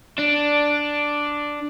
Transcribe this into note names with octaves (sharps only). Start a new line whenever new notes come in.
D4